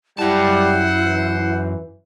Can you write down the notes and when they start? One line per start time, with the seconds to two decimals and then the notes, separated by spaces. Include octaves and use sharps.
0.19 F#2 G3 E4 C5 F#5 A5
1.05 E3